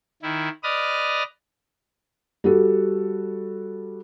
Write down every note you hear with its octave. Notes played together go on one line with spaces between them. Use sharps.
D#3 E4
B4 D5 D#5 D#6 F6
G3 F#4 A4